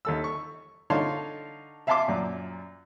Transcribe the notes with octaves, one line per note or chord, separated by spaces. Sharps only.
D#2 A4 E6
C#6
D3 D#4 C#5 F5 A5 C6
E5 F5 G#5 A5 C6 D6
F#2 A#2